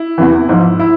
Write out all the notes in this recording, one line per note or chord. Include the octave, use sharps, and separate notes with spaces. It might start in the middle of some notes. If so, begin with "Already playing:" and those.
Already playing: E4
E2 C3 E3
G#2 F3
E4